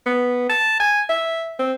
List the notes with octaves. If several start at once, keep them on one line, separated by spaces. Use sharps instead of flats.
B3
A5
G#5
E5
C4